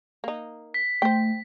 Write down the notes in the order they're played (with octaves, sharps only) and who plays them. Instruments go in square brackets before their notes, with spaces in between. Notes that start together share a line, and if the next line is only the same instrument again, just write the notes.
[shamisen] A#3 D#4
[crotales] B6
[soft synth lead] A3 [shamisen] C5 G5